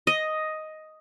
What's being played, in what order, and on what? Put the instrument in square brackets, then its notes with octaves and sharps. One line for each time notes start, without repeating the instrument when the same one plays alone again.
[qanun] D#5